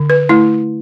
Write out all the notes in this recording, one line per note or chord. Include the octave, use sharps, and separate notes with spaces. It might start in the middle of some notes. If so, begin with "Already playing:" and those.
Already playing: D3
B4
A3 E4